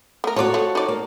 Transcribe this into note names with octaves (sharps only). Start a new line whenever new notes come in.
A3 A#4
F3 F#4 A4 C#5 D5
F3 A3
D#4 D5
A#3